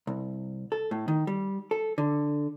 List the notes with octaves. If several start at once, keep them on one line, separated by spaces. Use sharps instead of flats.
C2
A4
A2
D#3
G3
A4
D3